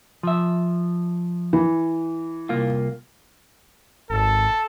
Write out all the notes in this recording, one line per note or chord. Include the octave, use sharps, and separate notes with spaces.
F3 E5
E3
C2 A#3 F4
G#1 A4